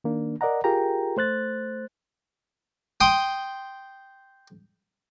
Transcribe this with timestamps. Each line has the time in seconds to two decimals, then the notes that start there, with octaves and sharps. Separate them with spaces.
0.04 D#3 A#3 D4
0.41 A#4 D5 D#5 F#5 A#5
0.64 F4 G4 G#4 A#4 G5 A#5
1.17 A3 C5 F#6 A6
3.01 G5 C6 D#6